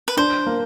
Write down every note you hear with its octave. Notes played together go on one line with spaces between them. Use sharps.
B4
D4 C5
A#3